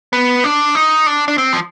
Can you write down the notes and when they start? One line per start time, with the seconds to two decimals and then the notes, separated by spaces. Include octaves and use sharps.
0.13 B3
0.44 D4
0.75 D#4
1.06 D4
1.28 D4
1.38 C4
1.53 F3